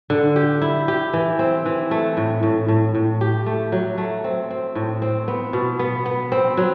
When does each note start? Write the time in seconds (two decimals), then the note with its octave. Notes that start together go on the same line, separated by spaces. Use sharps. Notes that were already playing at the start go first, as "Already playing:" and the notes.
0.10 D3
0.36 G4
0.62 E4
0.88 G4
1.13 E3
1.39 C4
1.65 E3
1.91 A3
2.17 A2
2.43 A2
2.68 A2
2.95 A2
3.21 G4
3.46 A3
3.72 F#3
3.98 A3
4.24 C4
4.50 C4
4.75 A2
5.02 C4
5.28 B3
5.53 B2
5.79 B3
6.06 B3
6.32 C4
6.57 F#3